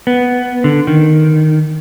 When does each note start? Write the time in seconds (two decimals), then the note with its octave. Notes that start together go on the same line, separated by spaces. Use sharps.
0.07 B3
0.64 D3
0.87 D#3